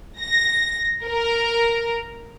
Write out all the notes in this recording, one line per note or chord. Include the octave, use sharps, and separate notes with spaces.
A#6
A#4